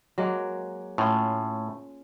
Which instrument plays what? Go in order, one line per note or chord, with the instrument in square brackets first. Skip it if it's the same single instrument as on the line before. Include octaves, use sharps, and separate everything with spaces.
[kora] F#3 G#3 A#3
[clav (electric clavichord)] A2 [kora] C#4 F4 F5